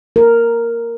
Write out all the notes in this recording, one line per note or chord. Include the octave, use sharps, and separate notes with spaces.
A#4